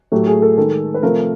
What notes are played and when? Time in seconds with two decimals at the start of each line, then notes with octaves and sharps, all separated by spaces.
0.12 A2 F#3 A3 G4
0.27 G#4
0.42 A4
0.58 D#3 G#3 A4
0.94 B4
1.02 C3 F3 A3 A#4